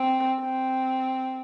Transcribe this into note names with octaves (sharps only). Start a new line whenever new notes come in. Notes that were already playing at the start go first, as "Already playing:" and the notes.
Already playing: C4
C4